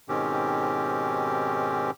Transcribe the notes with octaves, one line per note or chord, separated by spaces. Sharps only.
G#2 B2 D#3 C4 C#4 G4